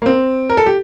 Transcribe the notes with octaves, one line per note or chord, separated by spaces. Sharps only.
A#3
C4
A#4
A4
G4